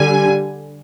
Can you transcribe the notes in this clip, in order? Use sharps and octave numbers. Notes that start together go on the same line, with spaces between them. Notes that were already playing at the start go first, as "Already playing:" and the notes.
Already playing: D3 G3 G#5